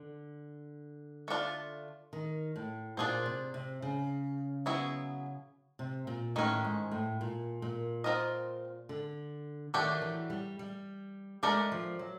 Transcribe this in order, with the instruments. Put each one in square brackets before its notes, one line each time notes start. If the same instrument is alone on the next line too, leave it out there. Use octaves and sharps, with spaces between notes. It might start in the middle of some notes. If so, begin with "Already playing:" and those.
Already playing: [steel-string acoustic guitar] D3
[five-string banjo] A3 D4 F4
[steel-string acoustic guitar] D#3
A2
[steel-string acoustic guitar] A#2 [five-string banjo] D4 F4 G#4 C5
[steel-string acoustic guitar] C3
C3
C#3
[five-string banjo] F#3 B3 E4 G#4
[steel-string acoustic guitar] C3
A#2
[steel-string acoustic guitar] A2 [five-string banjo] D#3 G#3 C#4
[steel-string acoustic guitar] G#2
A2
A#2
A#2
[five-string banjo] C4 F4 A#4 D#5
[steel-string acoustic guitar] D3
[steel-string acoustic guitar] D#3 [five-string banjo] F#3 A3 D4 G4
[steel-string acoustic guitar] E3
G3
G3
[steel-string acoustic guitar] G#3 [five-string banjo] A3 D4 G4 A#4 D5
[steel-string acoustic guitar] F3
F#3